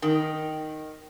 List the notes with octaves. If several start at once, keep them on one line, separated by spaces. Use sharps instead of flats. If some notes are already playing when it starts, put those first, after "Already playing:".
D#3